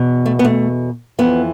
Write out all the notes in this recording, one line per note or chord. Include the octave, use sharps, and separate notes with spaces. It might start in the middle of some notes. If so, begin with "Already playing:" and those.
Already playing: E2 B2
A3
B3
A3
F2 E3 B3